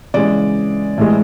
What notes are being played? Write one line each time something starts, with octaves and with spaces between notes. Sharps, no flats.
C#3 E3 G#3 D5
A2 E3 G#3